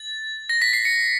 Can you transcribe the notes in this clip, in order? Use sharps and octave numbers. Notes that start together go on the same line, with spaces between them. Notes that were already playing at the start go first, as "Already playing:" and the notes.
Already playing: A6
A#6
B6
C7
C#7